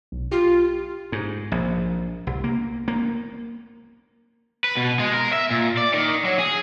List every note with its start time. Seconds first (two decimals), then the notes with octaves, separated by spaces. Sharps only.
0.12 B1
0.32 F4 G4
1.12 G#2
1.52 A#1
2.27 C2
2.44 A#3
2.88 A#3
4.64 B4
4.77 B2
4.99 G#3
5.13 A#4
5.33 E5
5.51 A#2
5.77 D5
5.93 D#3
6.25 F#3
6.38 G#4